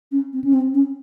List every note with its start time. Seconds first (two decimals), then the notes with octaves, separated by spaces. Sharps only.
0.12 C#4
0.33 C4
0.44 C#4
0.53 C4
0.74 C#4